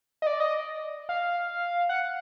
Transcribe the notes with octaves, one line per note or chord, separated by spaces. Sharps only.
D#5
D5
D#5
F5
F#5